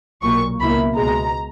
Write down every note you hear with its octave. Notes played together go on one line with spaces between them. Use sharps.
B1 A#2 F#3 A#3 C#6
C#2 B2 A#3 E4 B5
C#2 B2 G#3 A#5